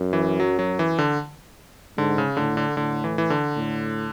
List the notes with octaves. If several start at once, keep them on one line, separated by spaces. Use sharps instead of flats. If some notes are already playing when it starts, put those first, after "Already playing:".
Already playing: F#2
E3
F#3
F#3
E3
D3
G#2 D3
C#3
A2 D3
D3
A2 D3
E3
E3
D3
A2